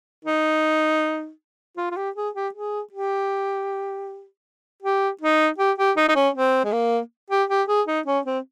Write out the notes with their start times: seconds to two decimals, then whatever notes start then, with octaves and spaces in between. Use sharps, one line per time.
0.25 D#4
1.77 F4
1.91 F4
1.97 G4
2.16 G#4
2.35 G4
2.54 G#4
2.92 G4
4.82 G4
5.21 D#4
5.58 G4
5.78 G4
5.97 D#4
6.09 D#4
6.16 C#4
6.34 C4
6.65 G#3
6.73 A#3
7.30 G4
7.49 G4
7.68 G#4
7.87 D#4
8.06 C#4
8.26 C4